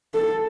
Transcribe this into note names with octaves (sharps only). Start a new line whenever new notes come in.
A4